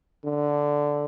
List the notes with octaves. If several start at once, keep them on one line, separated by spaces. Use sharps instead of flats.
D3